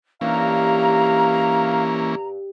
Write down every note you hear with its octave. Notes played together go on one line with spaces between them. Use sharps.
G2 E3 A#3 C#4 F5 A#5